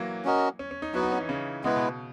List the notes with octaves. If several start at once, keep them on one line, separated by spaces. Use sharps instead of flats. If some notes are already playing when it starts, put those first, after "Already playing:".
Already playing: E3 F#3 A#3
C#4 F#4 A#4 D#5
C#4
C#4
D#4
F#3 B3 E4 F#4 B4
D#4
C#4
E3
C#3
C#3 G#3 B3 E4 B4
B2